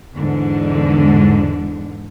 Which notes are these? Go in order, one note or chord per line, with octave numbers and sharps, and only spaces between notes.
E2 G#2 D3